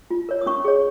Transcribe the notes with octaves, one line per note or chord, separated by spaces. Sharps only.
F4
A#4 C#5
D#6
C#4 C#6
G#4 C#5